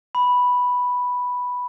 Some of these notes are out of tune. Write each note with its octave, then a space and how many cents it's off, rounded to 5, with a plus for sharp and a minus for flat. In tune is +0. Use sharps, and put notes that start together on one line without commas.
B5 +0